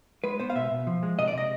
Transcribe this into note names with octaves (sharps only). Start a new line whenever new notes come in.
G#3 B4
B3 C5
F5
B2 E5
B2
F3
G#3
C3 D#5
D5
C3 D#5